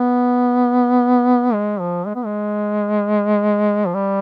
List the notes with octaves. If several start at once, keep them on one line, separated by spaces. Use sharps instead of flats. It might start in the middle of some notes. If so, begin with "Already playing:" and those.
Already playing: B3
G#3
F3
G#3
B3
G#3
F3
G3